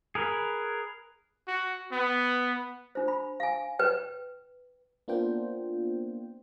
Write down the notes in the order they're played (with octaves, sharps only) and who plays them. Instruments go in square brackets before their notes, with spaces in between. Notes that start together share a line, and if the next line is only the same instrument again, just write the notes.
[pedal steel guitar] G#4 A#4 B4
[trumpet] F#4
B3
[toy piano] D4 C5
B5
F5 G#5
B4 G5
[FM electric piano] A#3 B3 D4 F4 C5 G5